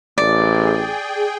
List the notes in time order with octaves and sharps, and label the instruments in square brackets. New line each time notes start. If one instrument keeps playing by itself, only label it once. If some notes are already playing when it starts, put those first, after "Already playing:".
[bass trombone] A1 [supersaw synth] G#4 G5 [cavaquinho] D5